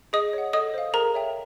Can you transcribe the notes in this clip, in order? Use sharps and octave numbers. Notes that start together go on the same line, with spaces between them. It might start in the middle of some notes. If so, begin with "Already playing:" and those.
G#4 D#5 D#6
C#5 F#5
A4 D#5 D#6
C5 F5
G#4 A#4 A#5
C#5 E5 G5